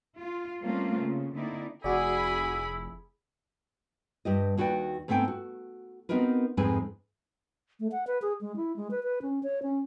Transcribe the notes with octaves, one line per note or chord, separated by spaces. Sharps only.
F4
G3 A3 A#3 C4 C#4 F4
C#3
D3 A#3 C4 D#4 E4 D5
F1 E4 F#4 G#4 D5 B5
G2 G4 D#5
D#2 F#4 B4 D5 G5
G#2 A3 B3 C4 G5 G#5
F#4
B3 C4 D#4 F#4 A#4 B4
F2 G#2 G#3 C4 B4 G#5
A3
F#5
B4
G#4
G#3
E4
G#3
B4
B4
C#4
C#5
C#4